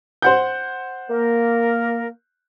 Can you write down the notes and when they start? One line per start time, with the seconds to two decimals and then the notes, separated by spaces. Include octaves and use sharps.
0.22 C5 F#5 G6
1.10 A#3 A#4